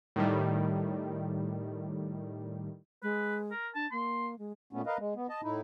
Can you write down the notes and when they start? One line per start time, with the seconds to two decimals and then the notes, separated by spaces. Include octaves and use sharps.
0.16 A2 D#3 G3
3.03 G#3 B4
3.51 A#4
3.75 D4 A5
3.92 A#3 C6
4.39 G#3
4.73 A#2 A3 B3 C#4
4.86 A#4 B4 D#5 F5
4.99 G#3
5.16 B3
5.29 D#5 A5
5.43 A2 D#4 E4